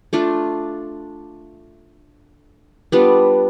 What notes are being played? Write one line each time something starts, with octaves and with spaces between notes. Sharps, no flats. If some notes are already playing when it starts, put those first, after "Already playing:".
A3 D4 F4
G3 B3 D4 F4